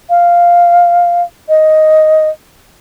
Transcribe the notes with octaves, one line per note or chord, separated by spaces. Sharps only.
F5
D#5